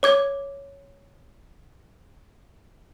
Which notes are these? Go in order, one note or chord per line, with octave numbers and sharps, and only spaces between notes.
C#5 D6 G#6